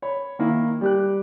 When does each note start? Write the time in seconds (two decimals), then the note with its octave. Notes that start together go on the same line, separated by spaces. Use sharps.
0.02 C#5 B5
0.39 D#3 A#3 E4
0.81 G3 G4 F#6